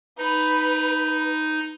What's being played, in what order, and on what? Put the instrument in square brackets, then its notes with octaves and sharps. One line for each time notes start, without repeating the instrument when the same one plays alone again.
[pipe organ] D#4 [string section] B4